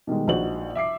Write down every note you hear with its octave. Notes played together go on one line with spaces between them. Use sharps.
B2 D#3 G3 G#3
A#1 D#4 F#4 C5 F#7
E5 D6 C7